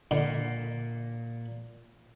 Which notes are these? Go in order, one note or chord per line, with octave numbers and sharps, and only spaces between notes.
A#2 D3